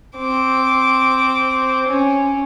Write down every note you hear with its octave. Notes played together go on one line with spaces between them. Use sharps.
C4 D6
C#4